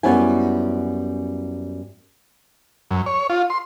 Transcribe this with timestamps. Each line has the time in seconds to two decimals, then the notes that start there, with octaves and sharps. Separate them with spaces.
0.03 F#2 G3 B3 C#4 E4 G#5
2.91 F#2
3.06 C#5
3.30 F4
3.50 C6